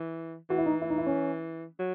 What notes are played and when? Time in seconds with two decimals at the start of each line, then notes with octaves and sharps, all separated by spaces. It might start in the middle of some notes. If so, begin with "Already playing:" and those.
Already playing: E3
0.50 E3 F#4
0.58 E4
0.66 D#4
0.82 E4
0.90 D#4
0.98 E4
1.06 C#4
1.79 F#3